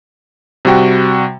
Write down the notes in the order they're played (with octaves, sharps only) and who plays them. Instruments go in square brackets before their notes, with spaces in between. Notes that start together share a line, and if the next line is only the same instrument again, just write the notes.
[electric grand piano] C3 G3 F#4 G5